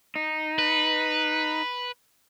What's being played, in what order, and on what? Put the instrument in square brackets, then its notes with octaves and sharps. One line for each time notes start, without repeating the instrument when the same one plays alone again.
[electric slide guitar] D#4
[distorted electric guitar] B4